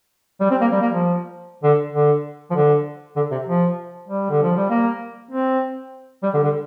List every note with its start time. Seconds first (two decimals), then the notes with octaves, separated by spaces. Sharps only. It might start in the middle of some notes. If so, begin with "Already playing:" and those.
0.40 G3
0.50 C4
0.61 A#3
0.72 G3
0.81 A#3
0.92 F3
1.63 D3
1.93 D3
2.51 F3
2.55 D3
3.16 D3
3.31 C3
3.47 F3
4.09 G3
4.30 D3
4.43 F3
4.57 G3
4.70 A#3
5.31 C4
6.23 G3
6.34 D3
6.44 D3